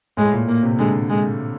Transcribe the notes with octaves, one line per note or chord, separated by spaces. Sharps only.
A2 G#3
A#2
A#3
C3
D3 G#3
G#3